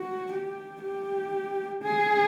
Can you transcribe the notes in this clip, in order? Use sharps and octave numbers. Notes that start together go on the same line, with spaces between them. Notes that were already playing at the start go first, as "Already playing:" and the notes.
Already playing: F#4
G4
G4
G#4